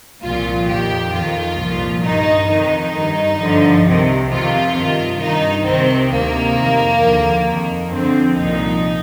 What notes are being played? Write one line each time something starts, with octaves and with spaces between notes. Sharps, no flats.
C2 A#2 F3 F4
F2 D#3 G4
F2 D#3 F4
C2 A#2 F3
G2 D#3 D#4
F2 D#3 D#4
G2 D#3
G2 D3 F3
C2 C3 D#3
F2 C3 D#3 F4
G2 D#3
G2 D#3 D#4
C2 C3 D#3 C4
D2 C3 D#3 A#3
F2 D#3
D#2 D3 F3
F2 D#3
F2 D3 F3 C4
C2 A#2 F3 D#4